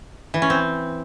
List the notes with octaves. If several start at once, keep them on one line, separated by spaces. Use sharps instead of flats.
E3
C#4
C4